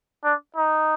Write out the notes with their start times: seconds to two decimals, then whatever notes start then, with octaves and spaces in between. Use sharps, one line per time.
0.24 D4
0.57 D#4